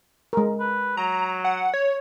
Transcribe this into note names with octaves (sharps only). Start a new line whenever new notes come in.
G#3 A#4
B4
F#3 A#5
F#5
C#5